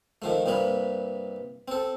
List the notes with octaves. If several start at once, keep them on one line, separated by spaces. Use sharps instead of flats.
D#3 F3 A3
C2 G2 C3 A#3 B5
C4 A4